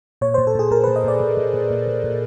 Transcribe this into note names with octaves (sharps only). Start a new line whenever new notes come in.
A#2 C#5
C5
A#2
A4
A#2 G#4
A#2 A#4
B4
A#2
D#5
A#2 D5
A#2
A#2
A#2
A#2
A#2
A#2